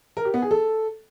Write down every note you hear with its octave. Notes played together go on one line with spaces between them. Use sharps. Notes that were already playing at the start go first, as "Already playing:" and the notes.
A#4
G4
B3
G#4
A4